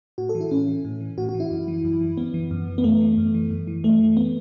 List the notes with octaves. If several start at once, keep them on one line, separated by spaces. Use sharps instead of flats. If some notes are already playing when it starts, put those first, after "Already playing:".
A2 F#4
A4
E3
E4
A2 C#4
E3
A2
E3
A2 F#4
F#4
E3
E4
F#2
E3
F#2
E3
F#2 B3
E3
F#2
E3
B3
F#2 A3
E3
F#2
E3
F#2
E3
F#2 A3
E3
B3